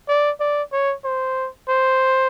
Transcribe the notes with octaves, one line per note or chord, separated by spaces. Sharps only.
D5
D5
C#5
C5
C5